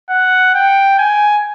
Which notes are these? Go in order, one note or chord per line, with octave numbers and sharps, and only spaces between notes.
F#5
G5
G#5